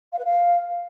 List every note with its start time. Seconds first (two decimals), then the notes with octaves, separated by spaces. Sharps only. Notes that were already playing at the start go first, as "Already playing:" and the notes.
0.12 F5
0.18 B4
0.24 F5